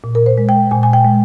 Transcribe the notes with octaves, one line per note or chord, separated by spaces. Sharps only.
A#2
A#4
C5
G#3
G5
A#2 G#5
G#5
G5
G#3